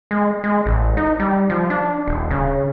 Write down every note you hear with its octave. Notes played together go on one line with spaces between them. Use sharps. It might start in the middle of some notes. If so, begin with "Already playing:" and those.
G#3
G#3
A1
D#4
G3
F3
D4
D#1
C#3